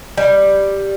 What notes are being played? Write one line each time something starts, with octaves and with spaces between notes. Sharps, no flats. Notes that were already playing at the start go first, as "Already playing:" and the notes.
G3